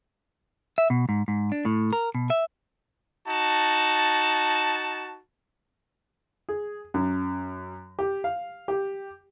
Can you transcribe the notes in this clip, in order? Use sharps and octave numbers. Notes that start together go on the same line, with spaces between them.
E5
B2
G#2
G#2
D4
A2
A#4
B2
E5
D#4 F#4 A5
G#4
F#2
G4
F5
G4